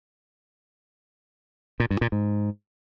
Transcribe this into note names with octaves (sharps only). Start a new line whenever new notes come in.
A#2
G2
A#2
G#2